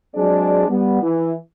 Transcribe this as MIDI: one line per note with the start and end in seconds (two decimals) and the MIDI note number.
0.15 0.66 54
0.15 0.66 56
0.15 0.66 60
0.15 0.66 62
0.15 0.66 68
0.15 0.66 74
0.68 1.00 55
0.68 1.00 59
1.02 1.33 52